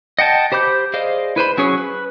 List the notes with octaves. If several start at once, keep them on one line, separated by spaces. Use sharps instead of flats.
D#5 F#5 G5 A5
G4 C5 B5 D6 G6
G#4 C5 D5 D#5 F5
E4 B4 C5 B5
F#3 C#4 G#4 C#5
B4